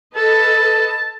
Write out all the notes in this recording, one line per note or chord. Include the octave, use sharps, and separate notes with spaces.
A4 B4 D#5 A5